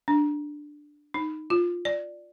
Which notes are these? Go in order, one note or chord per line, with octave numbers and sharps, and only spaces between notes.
D4
D#4
F4
D5